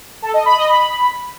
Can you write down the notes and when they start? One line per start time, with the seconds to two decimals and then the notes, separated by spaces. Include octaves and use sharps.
0.22 A4
0.34 D#5
0.46 B5
0.57 D#5
0.69 B5